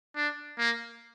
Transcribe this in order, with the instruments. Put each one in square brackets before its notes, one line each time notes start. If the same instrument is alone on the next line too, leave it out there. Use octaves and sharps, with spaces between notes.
[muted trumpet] D4
A#3